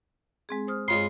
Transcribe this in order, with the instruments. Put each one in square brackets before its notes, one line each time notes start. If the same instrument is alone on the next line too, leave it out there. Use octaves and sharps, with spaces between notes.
[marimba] G#3 C4 G#4
C5 D#6 F6
[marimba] G2 C#5 [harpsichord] G#3 F4 C6